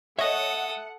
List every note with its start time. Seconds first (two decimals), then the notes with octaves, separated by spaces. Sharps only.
0.19 A4 C#5 D#5 E5 F#5 D#6